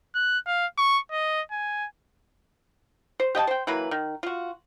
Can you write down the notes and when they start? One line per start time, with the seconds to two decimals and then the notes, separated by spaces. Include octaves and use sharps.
0.15 F#6
0.47 F5
0.78 C#6
1.12 D#5
1.51 G#5
3.20 C5
3.35 G4 D#5 G5 A5
3.47 C5 G5
3.67 E3 F#3 A#3 B4
3.91 D#3
4.23 F4 F#4